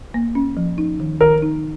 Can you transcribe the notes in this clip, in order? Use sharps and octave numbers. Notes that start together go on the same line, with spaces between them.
A#3
C#4
F3
D#4
D#3
D#3 A#4
D#4